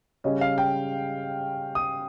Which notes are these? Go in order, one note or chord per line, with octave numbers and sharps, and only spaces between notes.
C#3 G3 C#4 D#5
F5
G5
D#6